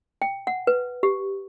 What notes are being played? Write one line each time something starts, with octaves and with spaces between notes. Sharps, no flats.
G5
F#5
B4
G4